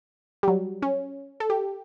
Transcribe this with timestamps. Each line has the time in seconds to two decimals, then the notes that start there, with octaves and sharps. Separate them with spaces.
0.43 G3
0.48 F#3
0.82 C#4
1.40 A4
1.50 G4